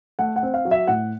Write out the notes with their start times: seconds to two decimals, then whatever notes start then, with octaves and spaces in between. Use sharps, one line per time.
0.19 A3 F#5
0.36 F#5
0.43 C4
0.54 F5
0.65 F#3
0.71 E5
0.87 A2 F#5